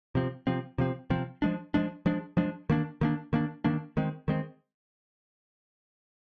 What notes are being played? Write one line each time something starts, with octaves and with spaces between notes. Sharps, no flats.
C3 F3 C4
C3 F3 C4
C3 F3 C4
C3 F3 C4
F3 G#3 D4
F3 G#3 D4
F3 G#3 D4
F3 G#3 D4
D#3 A#3 D4
D#3 A#3 D4
D#3 A#3 D4
D#3 A#3 D4
D#3 G#3 C4
D#3 G#3 C4